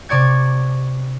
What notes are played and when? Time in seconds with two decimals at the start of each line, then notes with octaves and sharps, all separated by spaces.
0.09 C3 D5 C#6 G#6